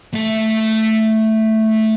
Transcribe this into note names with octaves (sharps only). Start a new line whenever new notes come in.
A3 E5